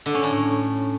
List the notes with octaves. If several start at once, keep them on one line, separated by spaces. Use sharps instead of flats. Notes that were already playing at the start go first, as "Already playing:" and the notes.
D3
C#4
A2